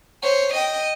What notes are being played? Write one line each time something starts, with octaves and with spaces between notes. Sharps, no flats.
C5 C#5
D#5 G5